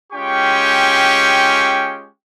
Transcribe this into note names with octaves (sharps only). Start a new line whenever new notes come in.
G#3 C#4 F4 G4 G5 C#6